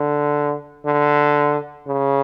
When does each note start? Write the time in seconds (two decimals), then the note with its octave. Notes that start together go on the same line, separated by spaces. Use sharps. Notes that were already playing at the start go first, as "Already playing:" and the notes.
Already playing: D3
0.86 D3
1.87 C#3